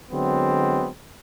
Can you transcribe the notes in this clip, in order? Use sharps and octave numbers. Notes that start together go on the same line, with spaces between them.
D3 F#3 G#3 B3 C4